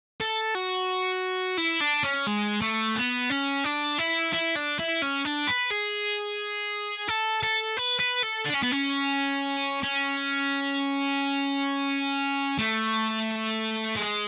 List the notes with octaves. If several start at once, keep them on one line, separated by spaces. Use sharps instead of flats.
A4
F#4
E4
D4
C#4
G#3
A3
B3
C#4
D4
E4
E4
D4
E4
C#4
D4
B4
G#4
A4
A4
B4
B4
A4
D4
C#4
B3
C#4
C#4
A3
G#3